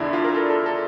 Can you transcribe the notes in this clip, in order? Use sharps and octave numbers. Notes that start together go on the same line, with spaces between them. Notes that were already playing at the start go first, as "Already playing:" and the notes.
Already playing: E2 D3 D4 E4
F4
A#4
A4
A4
A4